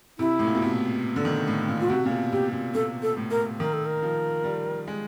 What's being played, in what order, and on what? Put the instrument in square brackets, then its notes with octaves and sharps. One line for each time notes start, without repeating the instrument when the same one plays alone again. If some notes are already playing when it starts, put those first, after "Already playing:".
[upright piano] C3 [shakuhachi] E4
[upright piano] A2
A#2
B2
C3
D3
D#3
A2
A#2
[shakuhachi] F4
[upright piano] C3 [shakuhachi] F#4
[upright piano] A#2
B2
[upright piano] C3 [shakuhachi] G4
[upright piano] A#2
[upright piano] A#2 [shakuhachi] A4
[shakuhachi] A4
[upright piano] A2
[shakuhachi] A#4
[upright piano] D#3 [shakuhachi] A#4
[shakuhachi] A4
A#4
[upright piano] F3
G3
G#3